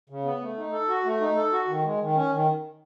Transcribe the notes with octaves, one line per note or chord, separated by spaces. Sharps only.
C#3
B3
A3
D#4
A4
F#4
A3
D#4
A4
F#4
D#3
G#3
D#3
C#4
D#3